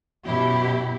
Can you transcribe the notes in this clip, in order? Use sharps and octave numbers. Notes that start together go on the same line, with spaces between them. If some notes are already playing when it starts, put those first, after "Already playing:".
F#2 B2 E4 G4